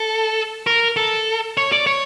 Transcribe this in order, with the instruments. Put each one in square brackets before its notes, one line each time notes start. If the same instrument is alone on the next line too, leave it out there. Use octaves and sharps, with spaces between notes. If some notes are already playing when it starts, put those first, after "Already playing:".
Already playing: [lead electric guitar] A4
A#4
A4
C#5
D5
C#5